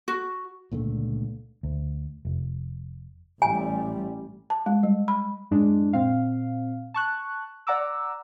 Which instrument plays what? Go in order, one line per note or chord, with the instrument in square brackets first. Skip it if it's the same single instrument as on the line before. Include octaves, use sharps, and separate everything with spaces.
[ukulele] F#4
[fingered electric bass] C#2 A#2 D3 A3
D2
F1
[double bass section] A1 G3 [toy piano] G#5
[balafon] A5
G#3
G3
B5
[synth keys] F#2 A2 G#3 D4
A#2 C4 F5
A5 C#6 F#6
D5 F#5 A#5 D6 E6